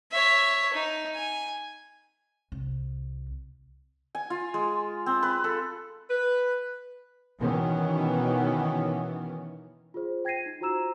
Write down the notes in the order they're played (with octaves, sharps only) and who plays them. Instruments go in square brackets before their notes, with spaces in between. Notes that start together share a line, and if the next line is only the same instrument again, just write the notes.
[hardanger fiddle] C#5 E5
D#4
G#5
[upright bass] C2
[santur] G#5
F4
G#3
C4
B4
A4
[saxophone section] B4
[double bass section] B2 D#3 E3 B3 C#4
[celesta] F4 G#4 C5
G5 G#6 A#6 C7 D#7
D#4
F4 F#4 C5 A#5 E6 E7